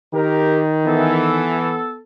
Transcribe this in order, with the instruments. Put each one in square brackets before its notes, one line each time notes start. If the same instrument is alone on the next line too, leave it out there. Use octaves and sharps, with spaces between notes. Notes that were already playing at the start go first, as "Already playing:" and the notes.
[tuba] D#3 [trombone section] G4 A#4
[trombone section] E3 [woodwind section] B3 A4